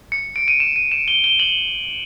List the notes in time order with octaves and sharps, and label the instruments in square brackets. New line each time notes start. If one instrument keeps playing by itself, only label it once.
[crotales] C#7
D7
D#7
E7
D#7
E7
G7
G7
F#7